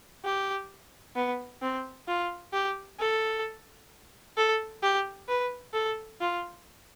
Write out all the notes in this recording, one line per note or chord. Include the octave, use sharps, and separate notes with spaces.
G4
B3
C4
F4
G4
A4
A4
G4
B4
A4
F4